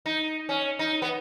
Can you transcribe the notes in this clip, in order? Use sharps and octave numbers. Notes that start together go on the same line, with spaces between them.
D#4
C#4
D#4
B3